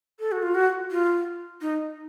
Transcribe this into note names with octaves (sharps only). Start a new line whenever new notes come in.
A4
F#4
F4
F#4
F4
D#4